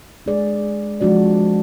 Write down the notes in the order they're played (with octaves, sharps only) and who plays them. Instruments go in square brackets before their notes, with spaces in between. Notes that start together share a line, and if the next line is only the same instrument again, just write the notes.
[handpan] G#3 D4 G#4 D5
F3 G#3 D4 F#4 D5